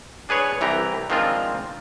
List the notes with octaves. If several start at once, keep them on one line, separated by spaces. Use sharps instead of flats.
D4 G#4 B4 C#5
C2 E3 G4 A#5
D#3 F3 G#3 C4 D4 F4